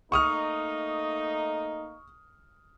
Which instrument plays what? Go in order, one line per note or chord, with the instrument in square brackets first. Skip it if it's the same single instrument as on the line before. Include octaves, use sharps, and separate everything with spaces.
[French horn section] A3 A#3 D#4 [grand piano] C#6 D#6 F6